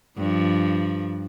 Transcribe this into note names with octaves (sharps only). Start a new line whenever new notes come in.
G2 F3